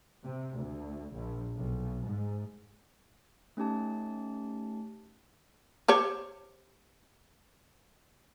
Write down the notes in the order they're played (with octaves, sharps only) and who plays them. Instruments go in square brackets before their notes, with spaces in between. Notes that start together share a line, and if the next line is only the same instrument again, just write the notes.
[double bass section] C3
D2
A#1
B1
G#2
[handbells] A3 C#4 D#4 G4 A5
[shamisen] G4 C5 C#5